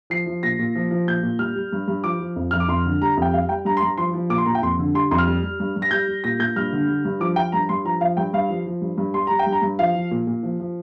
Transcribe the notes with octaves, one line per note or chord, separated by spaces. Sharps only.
F3 C7
F3
A#2 A#6
A#2
F3
F3
A#2 G6
A#2
G3 F6
G3
G2
G2
F3 D6
F3
F2
F2 F6
D6
F2 C6
D3
G3 A#5
F2 G5
G3 F5
G3 G5
G2 A#5
C6
G2 A#5
F3 C6
F3
A#2 D6
C6
A#2 A#5
G5
F2 C6
D3
G3 C6
F2 C6
F6
G3
G3
G2
G2
A#6
G3 G6
G3
A#2 A#6
A#2 G6
G2 F6
D3
G3
G2
F3 D6
F3 G5
G2 A#5
G2 C6
F3 A#5
F3 F5
G2 G5
G2 F5
F3
F3
G2
G2
G3 C6
G3 A#5
G5
G2
A#5
G2
F3 F5
F3
A#2
A#2
F3
F3